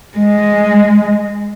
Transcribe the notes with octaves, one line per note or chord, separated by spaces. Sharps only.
G#3